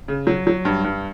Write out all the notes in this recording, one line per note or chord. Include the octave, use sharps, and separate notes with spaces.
C#3
F#3
F#3
G2
G2